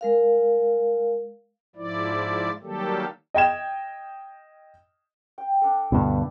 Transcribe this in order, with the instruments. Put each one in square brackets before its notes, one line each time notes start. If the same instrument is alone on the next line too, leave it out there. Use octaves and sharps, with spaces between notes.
[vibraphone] G#3 A#4 F5
[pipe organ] G#2 F3 E4 D5
D#3 F#3 G3 A#3 G4 A4
[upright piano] D#5 G5 G#6 E7
[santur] G5
D4 A4
[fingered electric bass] D2 G2 B2 [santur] E4